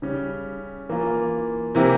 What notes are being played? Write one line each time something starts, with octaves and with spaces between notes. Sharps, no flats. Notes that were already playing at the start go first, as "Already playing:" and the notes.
C#3 G3 C#4
E3 A#3 F4
C3 E3 A#3 E4 G4